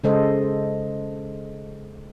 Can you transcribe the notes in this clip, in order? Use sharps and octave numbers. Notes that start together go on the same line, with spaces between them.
C#3 G#3 A4 C5 D#5